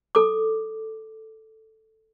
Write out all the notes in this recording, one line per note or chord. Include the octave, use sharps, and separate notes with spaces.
A4 D6